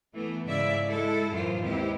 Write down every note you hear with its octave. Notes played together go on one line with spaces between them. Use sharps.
E3 A3 B3
G#2 C#3 E4 D5 E5
G#3 E4 A4
F#2 A2 E3 F4 C5
D#2 G#2 B3 C4 E4 G4